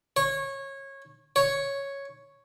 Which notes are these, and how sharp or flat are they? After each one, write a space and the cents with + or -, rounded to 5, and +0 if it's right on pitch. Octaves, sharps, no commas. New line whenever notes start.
C#5 -20
C#5 +0